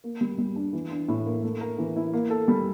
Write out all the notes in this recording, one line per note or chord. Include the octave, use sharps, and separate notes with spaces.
A#3
G3
G3
D4
E3
D4
A2
A#3
A3
A#4
E3
E4
A#3
A4
G3